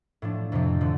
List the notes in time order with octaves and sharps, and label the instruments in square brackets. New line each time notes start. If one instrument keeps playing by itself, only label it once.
[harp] A2 F3 D4
F2 C3 F3
D3 F3 A3